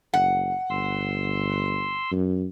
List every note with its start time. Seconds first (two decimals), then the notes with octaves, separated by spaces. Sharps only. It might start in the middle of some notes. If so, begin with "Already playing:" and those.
0.14 F#1 F#5
0.70 G1 C6 E6
2.11 F#2